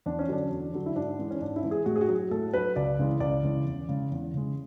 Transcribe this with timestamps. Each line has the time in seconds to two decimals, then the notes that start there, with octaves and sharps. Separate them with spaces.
0.06 E2 D4
0.19 C#4
0.29 D3 F#3 D4
0.51 E2
0.73 D3 F#3
0.86 E4
0.96 G#2 D4
1.19 E3 G#3
1.31 C#4
1.41 G#2 D4
1.56 E4
1.63 E3 G#3
1.71 G#4
1.86 A2 F#4
1.96 G#4
2.01 F#4
2.09 F#3
2.31 A2 A4
2.53 F#3 B4
2.76 C#2 D5
2.99 C#3 E3 G#3
3.20 C#2 D5
3.43 C#3 E3 G#3
3.66 E2
3.89 C#3 G#3
4.12 E2
4.34 C#3 G#3